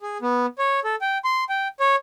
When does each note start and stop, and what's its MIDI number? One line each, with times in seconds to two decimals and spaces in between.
0.01 0.18 68
0.22 0.46 59
0.59 0.80 73
0.84 0.95 69
1.01 1.18 79
1.25 1.44 84
1.49 1.68 79
1.80 1.96 73